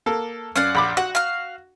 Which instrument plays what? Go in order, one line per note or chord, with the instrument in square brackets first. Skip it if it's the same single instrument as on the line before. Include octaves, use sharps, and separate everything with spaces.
[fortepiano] A#3 A4
[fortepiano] F#2 [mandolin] D5 F5 F#5
[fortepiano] A#1 B5 D6
[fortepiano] F#4 [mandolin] F#5
[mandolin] F5 F6